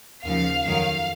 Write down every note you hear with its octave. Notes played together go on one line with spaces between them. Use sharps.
D#2 C#3 F3 F5
F2 D#3 F#3 F5